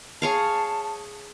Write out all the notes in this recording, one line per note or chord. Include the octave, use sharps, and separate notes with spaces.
G#4 C#5 F5 A5